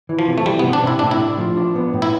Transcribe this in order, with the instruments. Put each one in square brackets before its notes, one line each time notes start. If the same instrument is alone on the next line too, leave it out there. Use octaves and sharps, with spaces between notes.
[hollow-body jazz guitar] E3
[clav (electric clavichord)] F3
[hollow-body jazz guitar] C3
[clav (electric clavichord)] A3
[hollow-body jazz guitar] E3 [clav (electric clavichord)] G3
[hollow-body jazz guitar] C3 [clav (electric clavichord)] B3
[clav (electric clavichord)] D4
[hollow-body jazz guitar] C3 [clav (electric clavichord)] E4
[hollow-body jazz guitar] A2 [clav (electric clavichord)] D4
[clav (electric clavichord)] E4
[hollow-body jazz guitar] D4
F3
D4
B3
A2
[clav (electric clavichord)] E4